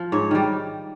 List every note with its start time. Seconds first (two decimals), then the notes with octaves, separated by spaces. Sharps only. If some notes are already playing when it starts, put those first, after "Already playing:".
Already playing: F3
0.12 G#2 C#5
0.31 D#3 G3